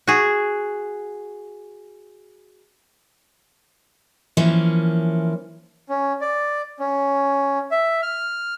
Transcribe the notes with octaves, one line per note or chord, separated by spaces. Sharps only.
F#4 G#4
E3 F3 A#3 C#4
C#4
D5
C#4
E5
F6